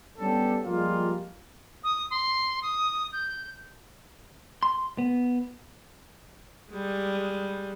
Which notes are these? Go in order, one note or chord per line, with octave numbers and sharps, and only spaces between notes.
G3 B3 C#4 D4 G4 A4
F3 G3 G#3 A#3 F4
D#6
C6
D#6
G6
C6
B3
G3 G#3